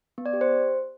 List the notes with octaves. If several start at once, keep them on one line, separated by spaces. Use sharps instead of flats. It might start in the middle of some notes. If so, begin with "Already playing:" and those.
B3
D5
G4
C5